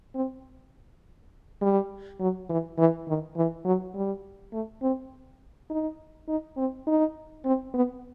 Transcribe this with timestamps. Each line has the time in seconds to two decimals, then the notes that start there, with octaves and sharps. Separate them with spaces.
0.15 C4
1.61 G3
2.20 F#3
2.49 E3
2.78 E3
3.08 D#3
3.36 E3
3.65 F#3
3.94 G3
4.53 A3
4.82 C4
5.70 D#4
6.28 D#4
6.57 C4
6.87 D#4
7.45 C4
7.74 B3